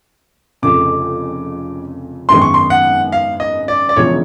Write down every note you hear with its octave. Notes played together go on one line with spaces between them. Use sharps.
F1 F2 C#3 D6
G#1 F#2 D#3 G#3 B3 C6
C#6
C6
F#5
F5
D#5
D5
D5
E1 E2 C#3 F3 C#5